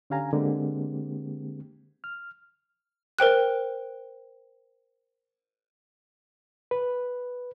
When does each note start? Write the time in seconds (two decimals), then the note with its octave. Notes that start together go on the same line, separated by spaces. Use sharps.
0.10 D3 C#4 G4 F5 G#5 A#5
0.33 D3 G#3 A#3 C4 G4
2.04 F6
3.19 A#4 C5 G5 F#6
6.71 B4